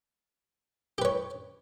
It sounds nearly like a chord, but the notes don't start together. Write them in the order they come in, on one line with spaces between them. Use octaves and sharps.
G4 B4 C#5